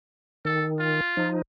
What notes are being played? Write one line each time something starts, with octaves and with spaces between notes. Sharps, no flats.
D#3 A4
F4
F3 D#4